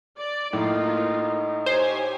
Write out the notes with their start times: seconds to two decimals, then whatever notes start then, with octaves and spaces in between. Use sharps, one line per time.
0.17 D5
0.53 A2 A#3 D#4 F4
1.66 G4 C5 C#5 G#5